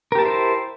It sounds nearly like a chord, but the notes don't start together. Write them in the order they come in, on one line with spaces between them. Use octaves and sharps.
A#4 G4 A5 E4 C5